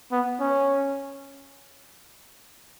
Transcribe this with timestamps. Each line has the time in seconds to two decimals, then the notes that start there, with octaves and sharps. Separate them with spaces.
0.12 B3
0.40 C#4